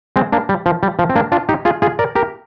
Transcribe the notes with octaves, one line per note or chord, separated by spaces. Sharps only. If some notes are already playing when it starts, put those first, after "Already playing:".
G#3 C4
A#3 D4
G3
F3
G3
F3
C4
A#3 D4
D4 F4
D#4 G4
F4 G#4
F4 G#4
A#4 D5
G4 A#4